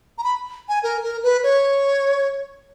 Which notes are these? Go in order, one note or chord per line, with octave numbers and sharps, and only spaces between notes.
A#5
B5
G#5
A#4
A#4
B4
C#5